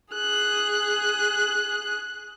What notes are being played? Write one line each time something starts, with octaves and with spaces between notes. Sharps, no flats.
G#4 F#6